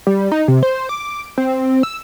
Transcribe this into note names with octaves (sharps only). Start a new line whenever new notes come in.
G3
D#4
C3
C5
D6
C4
E6